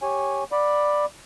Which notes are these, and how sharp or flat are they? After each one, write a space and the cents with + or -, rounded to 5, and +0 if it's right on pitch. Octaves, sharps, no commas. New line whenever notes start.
G4 +0 C#5 -10 G#5 -5
D5 +10 F#5 -25 B5 -5